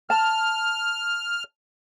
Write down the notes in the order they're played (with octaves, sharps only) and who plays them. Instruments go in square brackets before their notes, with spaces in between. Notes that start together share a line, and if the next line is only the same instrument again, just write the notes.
[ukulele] A5 [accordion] F6